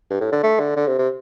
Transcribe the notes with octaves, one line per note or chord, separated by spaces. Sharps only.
G2
A2
D3
A3
D3
D3
C3
C3